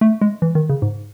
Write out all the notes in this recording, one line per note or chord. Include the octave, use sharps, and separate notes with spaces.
A3
G#3
E3
D#3
C#3
G#2